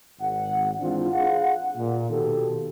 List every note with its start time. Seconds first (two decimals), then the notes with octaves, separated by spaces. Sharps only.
0.20 G#1 F#5
0.79 G#2 E3 C4 D4 F4
1.13 G#4 F5 F#5
1.77 A#2
2.10 B2 D#3 G4 A4